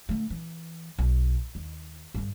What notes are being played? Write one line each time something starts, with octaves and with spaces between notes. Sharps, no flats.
D3 A3
E3
B1
D#2
G2 D3